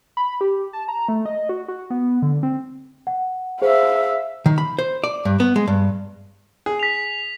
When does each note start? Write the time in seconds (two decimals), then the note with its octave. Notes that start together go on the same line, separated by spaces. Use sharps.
0.17 B5
0.41 G4
0.73 A5
0.88 A#5
1.09 A3
1.26 D#5
1.49 F#4
1.68 F#4
1.90 B3
2.22 D3
2.43 C4
3.07 F#5
3.62 G#4 C5 E5 F5
4.46 D#3
4.58 B5
4.79 C5
5.04 D5
5.25 G2
5.40 B3
5.56 G#3
5.68 G2
6.66 G#4
6.79 B6 F7